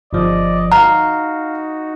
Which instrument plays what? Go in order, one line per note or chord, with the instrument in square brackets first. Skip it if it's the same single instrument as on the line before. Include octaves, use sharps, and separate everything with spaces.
[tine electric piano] G1 F3 [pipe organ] D5 D#5
[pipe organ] D#4 F#4 [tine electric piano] F5 [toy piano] A#5